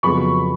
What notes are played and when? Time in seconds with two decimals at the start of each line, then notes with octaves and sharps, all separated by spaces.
0.03 F2 C#3 F#3 B3 B5 C#6